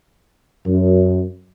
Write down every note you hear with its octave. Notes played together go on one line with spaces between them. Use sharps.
F#2